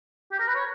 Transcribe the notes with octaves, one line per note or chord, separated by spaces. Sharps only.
G4
A#4
B4
C#5